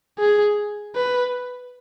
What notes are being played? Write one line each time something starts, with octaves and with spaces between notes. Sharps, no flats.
G#4
B4